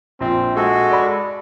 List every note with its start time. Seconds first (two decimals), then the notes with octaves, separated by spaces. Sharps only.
0.21 A#1 C4
0.55 G#3 F#4 A4
0.91 D5 B5